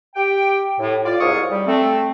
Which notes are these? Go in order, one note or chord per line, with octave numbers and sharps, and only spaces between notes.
G4 G5
A2
F4 D5
C2 G#2 C#5 F5 C#6 D#6
G3
A3 C4